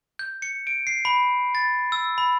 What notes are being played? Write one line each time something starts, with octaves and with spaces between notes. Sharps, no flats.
G6
C#7
D7
C7
B5
A6
E6
B5